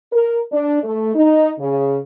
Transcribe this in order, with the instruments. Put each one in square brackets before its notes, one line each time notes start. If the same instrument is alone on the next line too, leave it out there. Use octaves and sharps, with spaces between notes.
[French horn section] A#4
D4
A3
D#4
C#3